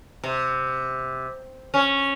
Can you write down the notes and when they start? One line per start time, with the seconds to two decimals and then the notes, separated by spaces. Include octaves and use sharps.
0.24 C3
1.74 C#4